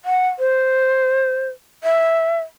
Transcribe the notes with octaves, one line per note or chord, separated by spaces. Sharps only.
F#5
C5
E5